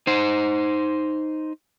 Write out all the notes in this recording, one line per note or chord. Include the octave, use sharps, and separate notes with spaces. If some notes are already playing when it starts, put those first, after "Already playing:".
D#4 C5